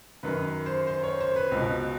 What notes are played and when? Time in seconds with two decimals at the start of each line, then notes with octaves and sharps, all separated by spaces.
0.23 F#2 D#3 B4
0.66 C5
0.87 C5
1.03 C#5
1.20 C5
1.36 B4
1.52 C#2 B2